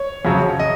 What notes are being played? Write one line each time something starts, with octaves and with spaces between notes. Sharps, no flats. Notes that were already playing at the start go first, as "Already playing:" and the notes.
Already playing: C#5
F2 C#3 F#3
D#5